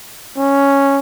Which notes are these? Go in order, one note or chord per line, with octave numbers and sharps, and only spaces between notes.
C#4